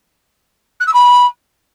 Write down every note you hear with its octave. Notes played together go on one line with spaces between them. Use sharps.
F#6
E6
B5